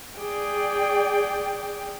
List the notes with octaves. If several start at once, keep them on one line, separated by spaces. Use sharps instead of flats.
G#4 D5 G5